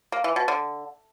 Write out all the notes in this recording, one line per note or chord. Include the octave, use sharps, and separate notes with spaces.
A#3
E3
B2
D3